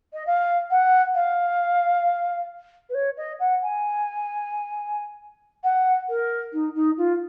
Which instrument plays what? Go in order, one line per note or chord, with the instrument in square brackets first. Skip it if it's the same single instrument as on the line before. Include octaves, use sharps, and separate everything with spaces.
[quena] D#5
F5
F#5
F5
B4
C#5
D#5
F#5
G#5
F#5
A#4
D#4
D#4
F4